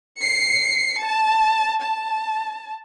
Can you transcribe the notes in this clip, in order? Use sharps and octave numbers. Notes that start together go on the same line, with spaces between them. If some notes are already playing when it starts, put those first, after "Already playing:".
C7 C#7
A5
A5